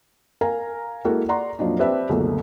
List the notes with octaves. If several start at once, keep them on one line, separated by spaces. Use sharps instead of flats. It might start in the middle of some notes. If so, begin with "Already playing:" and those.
A#4 F5 G#5 A#5
G#3 A#3 E4 F#4 A4 A#4
D5 F#5 A#5 C6 C#6
F2 A#2 F3 F#3 D4 D#4
C4 G4 B4 D5 E5 A5
C#2 F#2 B2 D3 A3 A#3